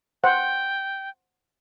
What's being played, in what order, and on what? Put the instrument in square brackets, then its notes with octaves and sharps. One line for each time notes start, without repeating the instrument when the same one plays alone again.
[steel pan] C5 F#5 [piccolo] G5